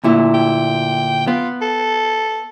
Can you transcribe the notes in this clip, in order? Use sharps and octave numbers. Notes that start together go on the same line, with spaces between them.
D2 A#2 E4
G5
B3 F4
A4